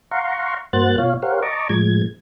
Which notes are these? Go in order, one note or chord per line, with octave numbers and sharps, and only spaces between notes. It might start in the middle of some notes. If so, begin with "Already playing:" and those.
F5 F#5 A#5 C6 C#6
G2 A#3 F#4 C5 F#6 A6
B2 F4 C#5 F5
G4 A#4 C5 C#5 F5 F#5
D#5 A5 A#5 C#6 D6
A2 F3 G#3 G#6